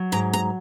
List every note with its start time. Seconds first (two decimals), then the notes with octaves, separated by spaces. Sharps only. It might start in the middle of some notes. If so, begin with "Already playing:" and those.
Already playing: F#3
0.12 G#2 A#5
0.33 A#5